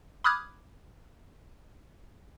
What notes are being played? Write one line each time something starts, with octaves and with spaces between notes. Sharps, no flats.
B5 D6 D#6 F6 F#6 G#6